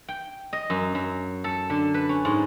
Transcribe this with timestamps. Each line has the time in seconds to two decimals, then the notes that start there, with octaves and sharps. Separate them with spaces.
0.08 G5
0.53 D#5
0.70 F#2
0.95 F#2
1.44 A4
1.70 D3
1.94 B4
2.09 C#4
2.25 G#2